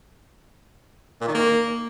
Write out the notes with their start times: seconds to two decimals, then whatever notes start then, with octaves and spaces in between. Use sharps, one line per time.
1.21 A#2
1.28 D#3
1.34 A#3